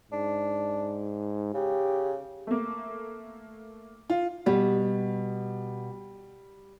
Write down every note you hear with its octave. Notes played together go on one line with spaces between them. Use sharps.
G#2 D4
C#3 G4
A3 A#3
F4
B2 G3 B3